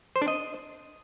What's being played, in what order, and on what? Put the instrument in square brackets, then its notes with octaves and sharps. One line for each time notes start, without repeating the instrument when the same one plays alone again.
[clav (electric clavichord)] C5
D4
D#5